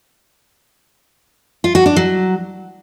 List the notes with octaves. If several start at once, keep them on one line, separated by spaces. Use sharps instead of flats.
F4
F#4
D4
F#3